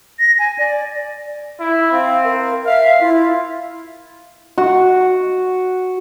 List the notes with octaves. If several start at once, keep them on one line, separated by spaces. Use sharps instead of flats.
A#6
G#5
D5
E4
C4 F5
A#4
E5 F5
E4 F4
F#4